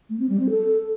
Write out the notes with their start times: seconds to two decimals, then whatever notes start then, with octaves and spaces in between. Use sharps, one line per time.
0.10 A3
0.20 C4
0.30 G3
0.40 C4
0.50 A4